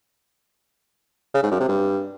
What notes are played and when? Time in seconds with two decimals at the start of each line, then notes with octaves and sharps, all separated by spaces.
1.34 C#3
1.43 G#2
1.51 F#2
1.60 C3
1.68 G2